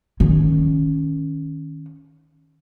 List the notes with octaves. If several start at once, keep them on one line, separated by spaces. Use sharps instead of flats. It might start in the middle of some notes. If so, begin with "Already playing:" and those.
D#3 C#4